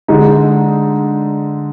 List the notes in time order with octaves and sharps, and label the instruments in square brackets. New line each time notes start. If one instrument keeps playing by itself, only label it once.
[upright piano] D3 G#3 D#4